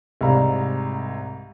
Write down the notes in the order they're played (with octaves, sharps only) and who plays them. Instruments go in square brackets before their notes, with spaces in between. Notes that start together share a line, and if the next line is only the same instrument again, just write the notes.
[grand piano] C2 G#2 D5 F5 A#5 B5